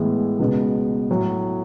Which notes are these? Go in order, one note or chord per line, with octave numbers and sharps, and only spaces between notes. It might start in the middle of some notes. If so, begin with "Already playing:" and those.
Already playing: A2 E3 G#3 B3
C#2 B2 G#3 B3
A2 F#3 A3